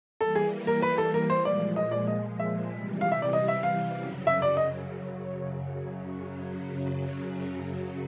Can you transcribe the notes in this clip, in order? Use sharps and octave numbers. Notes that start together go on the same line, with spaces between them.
E3 G3 A#3 A4
G#4
A#4
B4
A4
A#4
C5
A#2 F3 G#3 D5
D#5
D5
D#5
E5
C3 E3 G3
F5
E5
D5
D#5
E5
F5
F#2 C#3 F#3
E5
D5
D#5